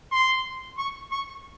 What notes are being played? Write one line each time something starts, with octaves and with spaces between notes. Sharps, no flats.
C6
C#6
C#6